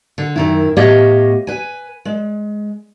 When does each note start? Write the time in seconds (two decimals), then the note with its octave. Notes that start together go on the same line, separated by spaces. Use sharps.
0.18 D3
0.36 F#2 D#3 E4
0.77 A2 B3 G4 C#5 D#5 F5
1.47 B4 G#5
2.05 G#3